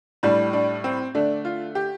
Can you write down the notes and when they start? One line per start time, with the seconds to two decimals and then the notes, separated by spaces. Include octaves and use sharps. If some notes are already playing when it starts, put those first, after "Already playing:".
0.23 A2 G3 D4
0.53 D4
0.84 C4
1.15 D3 A3 D4
1.45 F4
1.75 G4